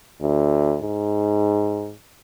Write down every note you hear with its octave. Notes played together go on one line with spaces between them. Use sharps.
D2
G#2